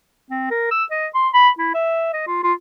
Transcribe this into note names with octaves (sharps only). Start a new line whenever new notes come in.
C4
A#4
E6
D#5
C6
B5
E4
E5
D#5
F4
F4